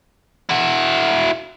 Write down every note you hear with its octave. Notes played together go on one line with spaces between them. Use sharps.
E4 F#4